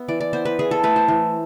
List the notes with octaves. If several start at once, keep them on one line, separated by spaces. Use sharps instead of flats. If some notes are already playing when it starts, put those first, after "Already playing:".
Already playing: B3 E5
E3 D5
D5
B3 C5
B4
E3 G#4
A4
A3 B4
C5
E3